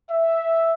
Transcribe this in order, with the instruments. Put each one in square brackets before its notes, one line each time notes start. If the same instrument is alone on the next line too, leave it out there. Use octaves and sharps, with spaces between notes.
[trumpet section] E5